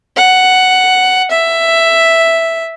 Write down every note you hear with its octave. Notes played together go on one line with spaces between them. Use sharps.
F#5
E5